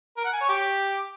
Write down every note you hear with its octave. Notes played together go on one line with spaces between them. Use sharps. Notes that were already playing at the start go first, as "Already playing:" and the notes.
A#4
F#5
G#5
C#5
G4